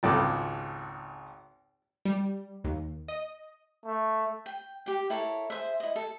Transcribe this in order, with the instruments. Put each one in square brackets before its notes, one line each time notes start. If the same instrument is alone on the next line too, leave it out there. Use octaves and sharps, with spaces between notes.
[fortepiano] G#1 C#2 A4 D6
[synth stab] G3
D#2
D#5
[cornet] A3
[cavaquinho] G5
G4 G5
E4 A4 A#4 C#5
G#4 C5 E5
E4 D#5
A4